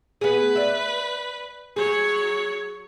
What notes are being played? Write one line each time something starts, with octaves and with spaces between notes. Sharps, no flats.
B3 G#4 B4
D5 E5
F#3 G#4 C#5